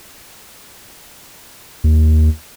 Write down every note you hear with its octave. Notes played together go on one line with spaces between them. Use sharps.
D#2